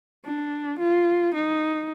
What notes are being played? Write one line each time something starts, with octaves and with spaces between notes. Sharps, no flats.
D4
F4
D#4